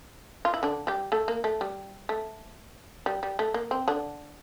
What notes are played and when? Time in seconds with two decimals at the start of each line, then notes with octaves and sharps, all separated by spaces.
0.45 F4
0.54 E4
0.63 D3 D4
0.87 G3 G4
1.12 A3 A4
1.28 A#3
1.44 A3
1.61 G3
2.09 A3
3.06 G3
3.23 G3
3.39 A3
3.54 A#3
3.71 C4
3.88 D3 D4